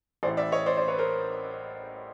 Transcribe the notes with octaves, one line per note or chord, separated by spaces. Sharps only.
A1 A2 E3 C5 D5
D5 E5
C#5 D#5
C5 D5
C5 D5
B4 C#5
A#4 C5